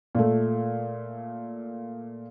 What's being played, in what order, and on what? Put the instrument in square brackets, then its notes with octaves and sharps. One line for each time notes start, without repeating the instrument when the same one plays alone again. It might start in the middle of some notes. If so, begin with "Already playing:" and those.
[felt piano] A#2 A3